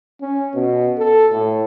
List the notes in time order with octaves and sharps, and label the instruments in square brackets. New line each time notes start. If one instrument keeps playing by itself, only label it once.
[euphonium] C#4
B2
A4
A2